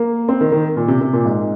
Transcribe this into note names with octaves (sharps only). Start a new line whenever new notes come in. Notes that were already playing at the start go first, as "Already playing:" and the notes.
Already playing: A#3
C4
D#3
D#3
A#2
C3
C3
A#2
G#2